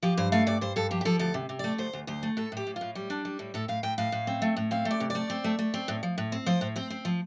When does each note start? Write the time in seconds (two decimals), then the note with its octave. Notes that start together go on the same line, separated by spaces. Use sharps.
0.03 F3 G4
0.17 G2 C5
0.32 A3 F5
0.47 G2 D5
0.61 G2 C5
0.76 G2 A4
0.91 F3 G4
1.01 G4
1.05 F3 A4
1.19 D2 A4
1.34 C3
1.49 C3
1.59 A3 D5
1.78 D2 C5
1.93 D2
2.07 D2 C5
2.23 A3
2.37 A2 A4
2.52 A2 G4
2.67 A2
2.76 F4
2.81 A2
2.95 G3
3.10 D4
3.25 G3
3.39 A2
3.54 A2 A4
3.68 A2 F5
3.83 A2 G5
3.98 A2 F5
4.12 A2
4.27 C4
4.42 A3
4.57 A2
4.71 C4 F5
4.85 A3
4.91 D5
5.00 C3
5.10 D5
5.15 A3
5.30 C4
5.44 A3
5.59 A3
5.74 C4
5.88 A2
6.03 F3
6.18 A2
6.32 C4
6.46 F3 C5
6.61 A2
6.76 C4 C5
6.90 C4
7.05 F3